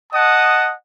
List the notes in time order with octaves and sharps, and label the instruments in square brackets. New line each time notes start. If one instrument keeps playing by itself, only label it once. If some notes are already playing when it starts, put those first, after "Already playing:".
[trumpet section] D#5 F#5 A5 D#6